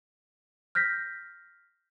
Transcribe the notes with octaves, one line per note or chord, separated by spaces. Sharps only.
F6 G6 A#6 B6